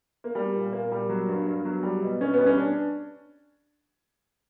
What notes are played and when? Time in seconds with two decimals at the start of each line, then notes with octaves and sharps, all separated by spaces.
0.24 A#3
0.35 G3
0.55 A#2
0.72 A#2 A#3
0.92 G3
1.09 F#3
1.28 G2
1.47 G2
1.65 F#3
1.83 G3
2.02 B2
2.20 B2 C#4
2.33 B3
2.39 G3
2.46 C#4
2.57 D4